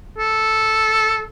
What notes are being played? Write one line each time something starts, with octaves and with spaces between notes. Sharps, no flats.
A4